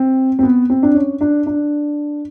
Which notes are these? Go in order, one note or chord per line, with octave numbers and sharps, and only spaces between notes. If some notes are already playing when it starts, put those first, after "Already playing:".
Already playing: C4
C4
B3
C4
D4
C#4
D4
D4